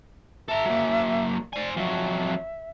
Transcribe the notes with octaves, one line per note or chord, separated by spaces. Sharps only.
A4 E5 A#5
F#3 A#3
C5 D5 G#5
F2 F#3 E5